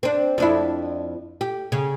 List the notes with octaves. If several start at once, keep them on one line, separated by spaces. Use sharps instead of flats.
C4 D4
F2 D4 E4
G4
C#3